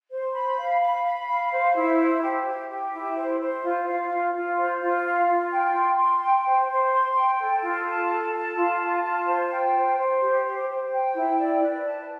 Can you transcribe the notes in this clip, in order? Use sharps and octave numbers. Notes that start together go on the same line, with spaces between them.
C5
B5
F5
B5
B5
F5
C5
E4
C5
G4
G4
G4
E4
C5
C5
F4
F5
F4
F4
C5
F4
F5
F4
G5
C6
C6
G5
C5
C5
C6
G5
A4
F4
A5
A4
A5
F4
A5
F4
C5
G5
C5
C5
G4
C5
C5
G5
E4
D5
B4
A5